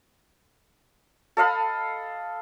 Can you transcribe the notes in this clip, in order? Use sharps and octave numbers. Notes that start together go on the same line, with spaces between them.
A4 D#5 F5 B5